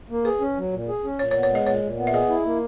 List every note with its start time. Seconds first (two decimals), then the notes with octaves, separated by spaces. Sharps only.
0.10 A#3
0.25 G#4 B4
0.40 C#4
0.57 F#3
0.72 A#2
0.88 G#4
1.04 C#4
1.19 A#2 C#5
1.31 C#5
1.35 B3
1.43 C#5
1.50 G#3 D#5
1.66 A#2 C#5
1.83 A#2
1.98 B3
2.07 E5
2.13 G#4 D#5
2.29 E4
2.45 A#3